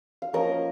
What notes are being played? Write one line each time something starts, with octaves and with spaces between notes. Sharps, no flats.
F5
F3 A#3 C#4 A#4 D#5